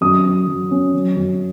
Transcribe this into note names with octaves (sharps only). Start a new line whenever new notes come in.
F#2 D#6
F#2
F#3
C#4
F#3
F#2